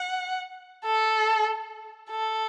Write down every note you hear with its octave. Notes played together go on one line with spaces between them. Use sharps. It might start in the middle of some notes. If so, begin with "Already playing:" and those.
Already playing: F#5
A4
A4